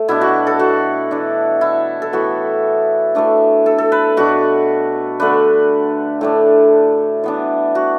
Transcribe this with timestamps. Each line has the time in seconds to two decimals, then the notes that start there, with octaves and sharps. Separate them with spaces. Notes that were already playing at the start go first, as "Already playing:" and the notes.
Already playing: A3
0.08 B2 B3 D4 E4
0.21 F#4
0.47 A4
0.60 F#4
1.11 E3 D4
1.61 E4
2.02 A4
2.13 A2 E3 B3 F#4
3.15 E3 A3 D4
3.66 A4
3.78 A4
3.92 B4
4.17 B2 A3 D4 F#4
5.20 D3 A3 D4 B4
6.21 A2 A3 D4
7.24 E3 B3 D4
7.75 F#4